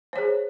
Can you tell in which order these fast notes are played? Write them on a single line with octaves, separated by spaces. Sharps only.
C5 C#5 G#4